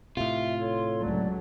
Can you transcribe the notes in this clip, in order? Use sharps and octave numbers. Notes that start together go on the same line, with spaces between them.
A2 C3 F4 E5
A4 C#5 C6
C#2 F#3 A3 D5